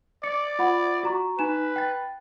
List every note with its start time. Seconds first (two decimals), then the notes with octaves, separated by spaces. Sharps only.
0.24 D5 C#7
0.59 F4 F#5 B5
1.03 F#4 A#5 C#6
1.39 D#4 B4 G#5 E7
1.76 G5 A6